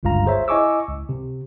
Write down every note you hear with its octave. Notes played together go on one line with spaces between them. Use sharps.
G1 C#2 G2 F4 F5 A#5
G#4 C5 C#5 E5
E4 D#5 G#5 C#6 D6 E6
C#2
C3